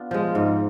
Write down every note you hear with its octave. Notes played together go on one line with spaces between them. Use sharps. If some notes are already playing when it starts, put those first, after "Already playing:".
Already playing: B3 D4 F4
F3 G#3
G#2